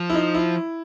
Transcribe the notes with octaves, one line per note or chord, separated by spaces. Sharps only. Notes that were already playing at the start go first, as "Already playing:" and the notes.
Already playing: F3
E4
D#4
E4